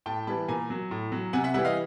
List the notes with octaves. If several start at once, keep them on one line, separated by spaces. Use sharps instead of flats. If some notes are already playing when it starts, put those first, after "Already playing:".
A2 G5 A5
E3 G3 A5 B5
A#2 G#5 A#5
F#3
A2
F#3
C3 F#5 G#5
E5 F#5
E3 G3 E5 F#5
D#5 F5